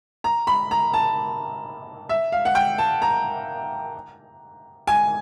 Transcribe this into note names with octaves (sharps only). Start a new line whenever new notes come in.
A#5
B5
A#5
A5
E5
F5
F#5
G5
A5
A#5
G#5